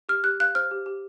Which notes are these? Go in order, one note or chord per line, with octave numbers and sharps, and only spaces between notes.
G4 F6
G4 F#6
F5 F#6
C5 F6
G4
G4